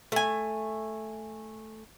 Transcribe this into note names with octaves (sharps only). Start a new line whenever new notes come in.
A3 G#5